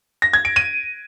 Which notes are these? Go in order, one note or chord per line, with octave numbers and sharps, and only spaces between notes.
A#6
G#6
D7
D#7